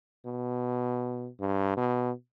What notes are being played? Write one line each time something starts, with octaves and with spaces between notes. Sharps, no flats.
B2
G2
B2